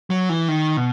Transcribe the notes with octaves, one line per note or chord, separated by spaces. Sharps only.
F#3
E3
D#3
B2